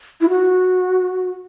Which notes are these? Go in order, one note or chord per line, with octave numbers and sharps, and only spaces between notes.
E4
F#4